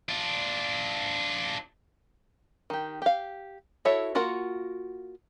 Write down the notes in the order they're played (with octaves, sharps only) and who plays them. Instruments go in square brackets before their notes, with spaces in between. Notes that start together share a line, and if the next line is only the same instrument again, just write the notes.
[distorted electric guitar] D4 F4
[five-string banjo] D#3 G4
G4 F5
E4 F#4 A4 C#5 E5
A#3 F4 F#4 A#4 F#5